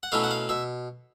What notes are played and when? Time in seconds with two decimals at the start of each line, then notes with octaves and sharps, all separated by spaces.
0.03 F#5
0.12 B2 F#3 A3 C#4 E4 F5
0.24 F#5
0.31 F5
0.49 B2 E5